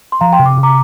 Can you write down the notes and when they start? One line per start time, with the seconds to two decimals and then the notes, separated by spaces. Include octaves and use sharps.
0.12 C6
0.21 F3 F5 A#5
0.33 G5 C6
0.39 C3
0.46 D6
0.57 C3
0.63 A#5 D6